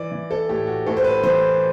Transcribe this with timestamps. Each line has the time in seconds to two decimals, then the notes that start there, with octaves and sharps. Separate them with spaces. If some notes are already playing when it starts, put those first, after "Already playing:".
Already playing: E3 D5
0.12 E3
0.31 A4
0.49 A2 G4
0.67 F#4
0.86 A2 A4
0.97 C5
1.04 B4
1.23 E3 C5